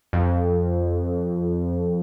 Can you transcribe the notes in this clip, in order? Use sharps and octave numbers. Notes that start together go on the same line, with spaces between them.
F2